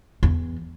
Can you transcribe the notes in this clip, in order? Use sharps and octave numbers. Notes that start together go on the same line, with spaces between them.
E2